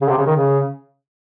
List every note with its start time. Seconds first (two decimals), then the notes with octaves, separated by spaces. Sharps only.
0.01 C#3
0.09 C3
0.18 C#3
0.26 D#3
0.36 C#3